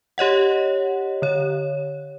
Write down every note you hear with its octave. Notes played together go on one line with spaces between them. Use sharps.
G4 C#5 D#5 F#5
D3 C#5